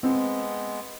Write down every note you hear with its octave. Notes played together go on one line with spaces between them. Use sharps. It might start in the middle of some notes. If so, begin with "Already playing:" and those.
G#3 B3 C4